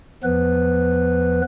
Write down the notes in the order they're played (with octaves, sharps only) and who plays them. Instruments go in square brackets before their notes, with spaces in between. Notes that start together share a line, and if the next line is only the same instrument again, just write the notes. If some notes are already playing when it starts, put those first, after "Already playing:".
[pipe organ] E2 F3 B3 B4